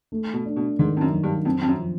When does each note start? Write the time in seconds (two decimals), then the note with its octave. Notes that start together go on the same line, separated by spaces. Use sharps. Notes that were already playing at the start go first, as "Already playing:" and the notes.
0.12 A3
0.33 B2
0.45 D4
0.56 B2
0.79 G#2 D#3
0.96 F2
1.01 F#2
1.12 F#3
1.23 G2
1.45 F2 C4
1.61 F2
1.68 F#2
1.79 F3